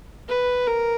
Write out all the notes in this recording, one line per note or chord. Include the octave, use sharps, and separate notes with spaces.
B4
A#4